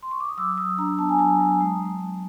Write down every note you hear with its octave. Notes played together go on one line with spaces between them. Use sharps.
C6
C#6
D6
D#6
F#3 E6
F#3 D#6
D4 A#5
B3 A5
G#5
F#3 A5
F#3
G#3
G#3
G#3